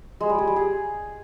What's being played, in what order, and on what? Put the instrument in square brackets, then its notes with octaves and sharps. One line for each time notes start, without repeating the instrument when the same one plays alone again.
[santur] G#3
G3
G#4
G3
G#4